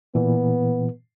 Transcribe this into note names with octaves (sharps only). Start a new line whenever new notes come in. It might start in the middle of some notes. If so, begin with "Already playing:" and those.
A#2 E3 B3